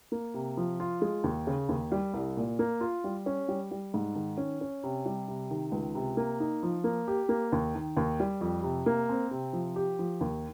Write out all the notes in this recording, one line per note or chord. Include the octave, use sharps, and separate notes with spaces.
A#3
C3
F3
F4
G#3
D#2
C#3
D#2
G3
C2
A#2
A#3
F4
G3
C#4
G3
G3
G#2
D#3
C#4
C#4
C3
G3
C3
D#3
C#2
C3
A#3
D#4
F3
A#3
G4
A#3
D#2
D#3
D#2
G3
F2
C3
A#3
C4
C3
F3
G4
F3
D#2